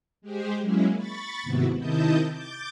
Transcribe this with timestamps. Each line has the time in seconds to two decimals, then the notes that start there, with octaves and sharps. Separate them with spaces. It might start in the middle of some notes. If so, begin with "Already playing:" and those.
0.22 G#3 G4 G#4 C5
0.61 F#3 G#3 A#3 C#4 E4
0.96 B5 C#6 A6
1.43 D#2 G#2 C3 B3 E4 F#4
1.77 C3 D#3 E4 D#5 A5 G6
2.31 D6 G6 A6